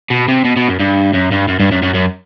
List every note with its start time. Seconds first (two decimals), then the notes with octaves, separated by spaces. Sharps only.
0.10 B2
0.28 C3
0.45 B2
0.57 B2
0.68 F#2
0.79 G2
1.13 F#2
1.31 G2
1.48 F#2
1.60 G2
1.72 F#2
1.83 F#2
1.94 F#2